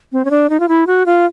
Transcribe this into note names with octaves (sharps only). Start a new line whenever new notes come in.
C4
C#4
D4
D#4
F4
E4
F#4
F4